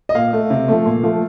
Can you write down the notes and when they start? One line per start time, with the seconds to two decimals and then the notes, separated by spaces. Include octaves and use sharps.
0.09 D#5
0.15 A#2 F5
0.33 A3
0.50 C3
0.68 F3 A3
0.86 A#2
1.03 F3 A3